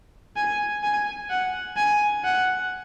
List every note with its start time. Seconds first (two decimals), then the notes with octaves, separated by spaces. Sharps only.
0.36 G#5
0.83 G#5
1.30 F#5
1.77 G#5
2.24 F#5